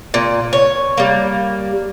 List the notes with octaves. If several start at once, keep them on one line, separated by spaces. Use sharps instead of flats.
A#2
C#5
G3 A#3